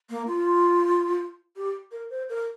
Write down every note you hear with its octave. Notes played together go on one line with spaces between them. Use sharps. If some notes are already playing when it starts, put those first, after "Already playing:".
A#3
F4
G4
A#4
C5
A#4